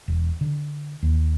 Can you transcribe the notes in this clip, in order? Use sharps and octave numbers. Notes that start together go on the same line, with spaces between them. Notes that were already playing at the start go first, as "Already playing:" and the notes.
E1
D3
D#2